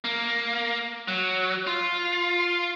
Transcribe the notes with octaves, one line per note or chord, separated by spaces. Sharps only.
A#3
F#3
F4